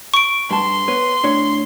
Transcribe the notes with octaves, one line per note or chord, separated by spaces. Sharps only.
C#6 D7
G2 A5 C6
B3 B4 C#5
A2 D4 C#5